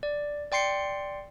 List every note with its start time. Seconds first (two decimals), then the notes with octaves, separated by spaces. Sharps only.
0.03 D5
0.52 D5 G5 C6 C7 C#7